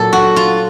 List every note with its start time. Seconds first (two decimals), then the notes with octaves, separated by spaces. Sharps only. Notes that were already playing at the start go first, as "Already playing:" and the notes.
Already playing: A#2 F#3 A4
0.13 F#4
0.36 F4